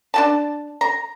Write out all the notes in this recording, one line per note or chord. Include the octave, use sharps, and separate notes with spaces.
D4 F#4 A5
A#5